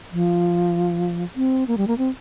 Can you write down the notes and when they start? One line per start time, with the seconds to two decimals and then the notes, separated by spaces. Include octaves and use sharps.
0.12 F3
1.36 C4
1.68 A#3
1.77 G3
1.87 A#3
1.98 C4